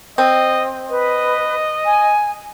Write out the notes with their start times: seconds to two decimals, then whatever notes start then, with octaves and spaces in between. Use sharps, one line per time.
0.18 C4 D#5
0.89 B4 D#5
1.85 G#5